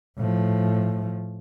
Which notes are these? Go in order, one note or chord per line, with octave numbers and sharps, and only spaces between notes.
A2 F3